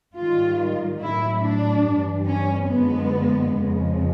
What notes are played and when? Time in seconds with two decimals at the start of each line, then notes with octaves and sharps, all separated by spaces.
0.15 G#2 D#3 G3 F4
1.00 A2 F#3 E4
1.42 D4
1.84 G2 E3 G3
2.27 C#4
2.68 F#2 D3 F3 G#3 B3
3.53 F2 C#3 F3 G#3